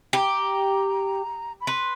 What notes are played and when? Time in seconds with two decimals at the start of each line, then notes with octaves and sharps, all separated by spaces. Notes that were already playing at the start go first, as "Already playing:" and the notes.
0.13 G4 B5
0.17 A#5
1.60 B5
1.67 B4 C6